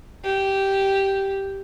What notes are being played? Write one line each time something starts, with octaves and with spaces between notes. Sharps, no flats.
G4